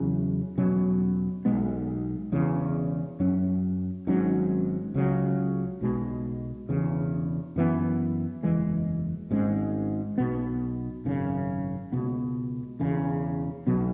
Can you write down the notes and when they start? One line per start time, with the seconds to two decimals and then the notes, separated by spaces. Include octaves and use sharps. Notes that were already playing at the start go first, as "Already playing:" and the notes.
Already playing: E2 C#3 F#3 C#4
0.58 E2 B2 F#3 C#4
1.45 B1 B2 G#3 B3
2.32 E1 E2 C#3
3.20 F#2 F#3 C#4
4.07 G#1 G#2 F#3 C#4
4.94 C#2 C#3 F#3
5.81 B1 B2 G#3
6.69 E1 E2 C#3
7.56 F#2 E3 B3
8.43 F#1 E2 E3 G#3
9.30 G#1 G#2 G#3 C#4
10.18 B1 B2 B3
11.05 G#1 F#2 C#3
11.92 C#2 B2 B3
12.79 E1 E2 C#3
13.67 B1 B2 F#3 B3